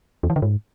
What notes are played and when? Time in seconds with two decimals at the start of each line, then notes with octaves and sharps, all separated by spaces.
0.23 E2
0.30 E3
0.36 D3
0.42 G#2